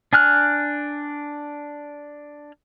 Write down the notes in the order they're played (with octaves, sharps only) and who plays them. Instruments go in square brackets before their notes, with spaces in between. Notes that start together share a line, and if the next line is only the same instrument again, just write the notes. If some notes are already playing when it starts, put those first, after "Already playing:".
[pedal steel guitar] D4 G#5 F6 F#6